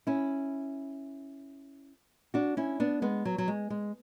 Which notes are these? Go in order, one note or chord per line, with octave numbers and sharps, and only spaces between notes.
C#4 E4
D4 F#4
C#4 E4
B3 D4
G#3 B3
F#3
F#3
G#3
G#3